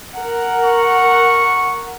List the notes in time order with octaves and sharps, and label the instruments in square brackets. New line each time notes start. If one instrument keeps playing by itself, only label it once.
[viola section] A#4 F#5
[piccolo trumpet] C#6